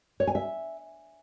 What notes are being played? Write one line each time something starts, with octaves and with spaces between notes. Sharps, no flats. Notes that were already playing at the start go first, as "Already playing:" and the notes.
C#5
G#5
E5